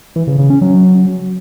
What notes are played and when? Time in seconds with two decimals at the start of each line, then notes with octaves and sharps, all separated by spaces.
0.16 E3
0.27 C#3
0.39 C#3
0.50 C#4
0.62 F#3